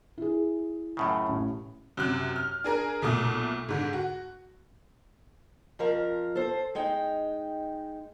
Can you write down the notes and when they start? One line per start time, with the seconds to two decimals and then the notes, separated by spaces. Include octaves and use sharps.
0.18 E4 G#4
0.97 F#2 A2 C#3
1.29 A1
1.97 F#2 C3 F#6
2.36 F6
2.64 D4 G#4 A#4
3.02 B1 A#2 A3 D#6
3.69 G#2 D3 G#3
3.93 F#4
5.79 F2 F3 A#4 F5
6.35 A4 C5
6.75 G#3 D#4 G5